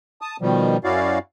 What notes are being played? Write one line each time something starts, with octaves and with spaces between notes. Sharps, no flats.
A5 D#6
B2 D#3 F3 G3
F#2 C#4 E4 F#4 D5 F5